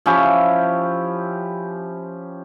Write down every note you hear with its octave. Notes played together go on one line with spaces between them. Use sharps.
F3 C#4 E4 G4